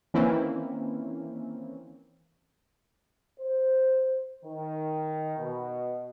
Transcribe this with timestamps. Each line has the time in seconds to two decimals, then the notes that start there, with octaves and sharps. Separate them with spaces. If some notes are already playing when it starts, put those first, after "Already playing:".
0.14 D#3 E3 A#3 C4 C#4 E4
3.40 C5
4.45 D#3
5.39 B2